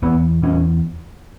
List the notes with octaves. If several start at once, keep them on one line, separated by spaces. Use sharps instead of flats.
E2 B3
E2 C#4